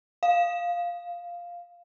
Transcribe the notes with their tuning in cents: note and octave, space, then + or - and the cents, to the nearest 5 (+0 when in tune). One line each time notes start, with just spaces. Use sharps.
F5 +0